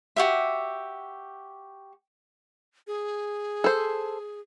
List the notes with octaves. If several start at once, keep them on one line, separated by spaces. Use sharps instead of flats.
F#4 G4 E5
G#4
A4 C5